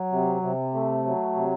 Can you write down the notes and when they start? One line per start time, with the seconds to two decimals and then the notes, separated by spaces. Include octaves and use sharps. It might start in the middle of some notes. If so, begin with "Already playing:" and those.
Already playing: F#3
0.12 C3
0.42 C3
0.74 A3
1.05 F#3
1.35 C3